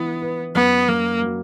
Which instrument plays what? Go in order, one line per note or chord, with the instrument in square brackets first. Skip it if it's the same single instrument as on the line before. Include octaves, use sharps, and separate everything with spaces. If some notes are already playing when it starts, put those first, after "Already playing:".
Already playing: [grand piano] E3 E4 [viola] B3
[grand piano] B4
[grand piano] F#2 [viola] B3
[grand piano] F#2 [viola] A#3
[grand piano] F#3